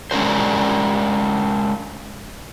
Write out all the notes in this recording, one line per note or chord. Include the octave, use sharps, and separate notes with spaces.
G#3 C#4 D4 A#4 C5